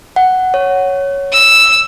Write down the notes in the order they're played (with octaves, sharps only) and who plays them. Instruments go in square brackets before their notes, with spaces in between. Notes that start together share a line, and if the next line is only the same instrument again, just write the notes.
[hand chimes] F#5
C#5
[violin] E6